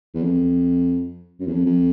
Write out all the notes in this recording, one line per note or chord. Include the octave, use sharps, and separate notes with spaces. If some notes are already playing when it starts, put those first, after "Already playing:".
E2
F2
F#2
E2
F2
F2